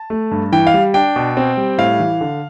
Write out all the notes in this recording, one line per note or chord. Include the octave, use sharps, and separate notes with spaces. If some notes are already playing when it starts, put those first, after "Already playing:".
Already playing: A5
A3
G2
E3 G5
F5
G3
D4 G5
B2
C4
G3
A2 F5
E3
D3